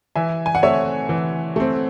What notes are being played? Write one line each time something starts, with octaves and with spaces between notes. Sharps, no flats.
E3 E5 G#5
G#5
F#5
A3 C4 C#5 E5
E3
A3 C4